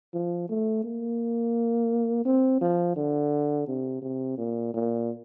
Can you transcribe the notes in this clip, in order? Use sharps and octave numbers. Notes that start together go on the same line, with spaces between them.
F3
A3
A#3
C4
F3
D3
C3
C3
A#2
A#2